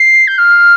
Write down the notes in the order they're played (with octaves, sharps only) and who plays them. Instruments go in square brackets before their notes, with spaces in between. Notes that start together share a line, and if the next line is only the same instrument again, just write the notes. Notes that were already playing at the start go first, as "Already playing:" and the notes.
Already playing: [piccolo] C7
G6
F6